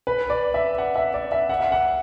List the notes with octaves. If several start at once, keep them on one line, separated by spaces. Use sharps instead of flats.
B4
D5
E5
F#5
E5
D5
E5
F#5
E5
F#5